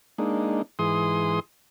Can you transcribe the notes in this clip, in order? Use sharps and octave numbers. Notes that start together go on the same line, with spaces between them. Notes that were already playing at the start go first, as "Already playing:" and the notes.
G#3 A#3 D4 D#4
G#2 E3 G#4 C6 D#6